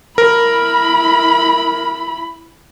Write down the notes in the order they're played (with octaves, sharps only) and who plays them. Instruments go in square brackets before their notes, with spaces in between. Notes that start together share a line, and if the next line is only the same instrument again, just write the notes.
[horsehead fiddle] E4 B5 [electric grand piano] A#4